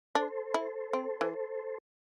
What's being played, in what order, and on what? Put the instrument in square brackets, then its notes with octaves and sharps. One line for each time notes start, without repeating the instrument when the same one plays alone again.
[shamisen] D4 [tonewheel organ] A4 C5
[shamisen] E4
C4
E3